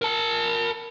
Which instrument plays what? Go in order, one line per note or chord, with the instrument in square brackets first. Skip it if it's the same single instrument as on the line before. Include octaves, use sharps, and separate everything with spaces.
[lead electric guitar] A#4 A5